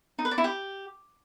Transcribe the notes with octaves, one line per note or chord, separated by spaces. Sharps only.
D#4
B4
D5
E4
G4